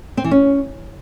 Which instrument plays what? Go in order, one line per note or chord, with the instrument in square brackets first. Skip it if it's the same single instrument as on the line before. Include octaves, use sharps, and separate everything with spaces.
[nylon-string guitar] C4
E3
C#4